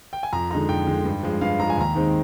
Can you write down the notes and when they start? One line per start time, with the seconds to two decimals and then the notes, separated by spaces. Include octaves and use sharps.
0.13 G5
0.23 G#5
0.33 F2 A#5
0.51 D3 G#3 D#4 A#5
0.69 F2 G5
0.87 D3 G#3 D#4
1.05 G2
1.23 F3 G#3
1.41 G2 F5
1.59 F3 G#3 A#5
1.70 G#5
1.77 D#2 A#5
1.95 D#3 G#3 C4 D#4